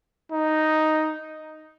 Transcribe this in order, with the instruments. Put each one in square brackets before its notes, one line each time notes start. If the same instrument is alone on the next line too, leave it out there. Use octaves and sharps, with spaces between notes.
[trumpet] D#4